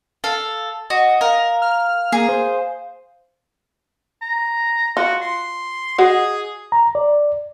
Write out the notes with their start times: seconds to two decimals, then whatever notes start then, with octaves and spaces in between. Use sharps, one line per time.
0.24 A4 F5
0.90 F#4 D#5
1.21 A#4 F5
1.62 F6
2.12 A#3 G#4
2.29 C5
4.22 A#5
4.97 F4 F#4
5.22 C6
5.98 F#4 G#4 D#5 F#5
6.72 A#5
6.95 D5